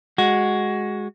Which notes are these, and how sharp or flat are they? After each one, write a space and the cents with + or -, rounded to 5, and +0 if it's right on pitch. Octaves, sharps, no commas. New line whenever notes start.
G#3 +0 F#4 +0